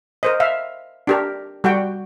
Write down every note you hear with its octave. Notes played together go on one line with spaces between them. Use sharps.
A#4 C5 D#5
E5 F5
D4 G4 A#4
G3 F#4 F#5 G5